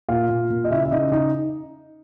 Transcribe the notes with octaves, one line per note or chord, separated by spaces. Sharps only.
A#2 F4 F5
A#2
A#2
D#5
C#3 E4 E5
E5
C#3 D#4 D#5
D#4 D#5